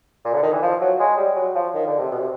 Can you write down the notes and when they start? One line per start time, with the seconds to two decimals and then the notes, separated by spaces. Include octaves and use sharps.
0.25 A#2
0.34 D3
0.43 D#3
0.52 E3
0.62 F3
0.81 F#3
1.00 G#3
1.17 G3
1.36 F#3
1.55 F3
1.74 D#3
1.87 D3
1.99 C3
2.11 B2
2.20 C3